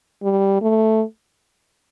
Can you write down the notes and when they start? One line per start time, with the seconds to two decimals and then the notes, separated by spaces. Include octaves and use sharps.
0.23 G3
0.62 A3